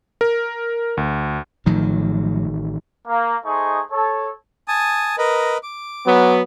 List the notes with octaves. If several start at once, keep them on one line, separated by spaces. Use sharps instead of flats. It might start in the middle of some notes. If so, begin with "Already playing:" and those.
A#4
D2
A1 A2 D#3 F3 F#3
A#3
A3 D#4 G#4 C5 D#5 C#6
A4 C#5
G#5 A5 D#6
A#4 B4 D#5
D6
F#3 B3